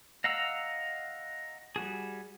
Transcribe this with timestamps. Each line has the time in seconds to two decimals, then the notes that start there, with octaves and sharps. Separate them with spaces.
0.24 D#5 F5 F#5 A#5 E6
1.76 G3 F#4 G#4